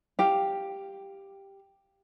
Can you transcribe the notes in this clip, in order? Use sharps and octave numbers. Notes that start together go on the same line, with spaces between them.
G4 F5